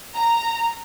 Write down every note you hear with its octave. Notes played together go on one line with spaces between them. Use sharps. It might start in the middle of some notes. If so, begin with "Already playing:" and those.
A#5